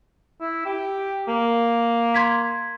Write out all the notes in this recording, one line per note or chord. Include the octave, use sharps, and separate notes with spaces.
E4
G4
A#3
C6 G#6 B6